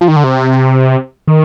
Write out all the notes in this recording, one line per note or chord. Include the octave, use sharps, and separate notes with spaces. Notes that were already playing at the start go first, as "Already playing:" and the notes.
F3
D#3
D3
C3
D#3